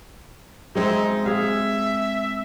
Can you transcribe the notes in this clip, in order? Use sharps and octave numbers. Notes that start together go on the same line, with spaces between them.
G#3 C4 D#4 E5
G#4 E5 F5